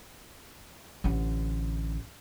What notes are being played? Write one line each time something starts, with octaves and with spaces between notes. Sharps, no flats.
A1 D3